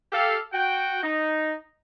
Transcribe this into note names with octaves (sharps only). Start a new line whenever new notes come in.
G4 A4 F5
F#4 G5
D#4